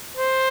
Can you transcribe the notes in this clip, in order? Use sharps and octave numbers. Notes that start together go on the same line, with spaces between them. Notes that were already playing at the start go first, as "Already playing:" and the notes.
C5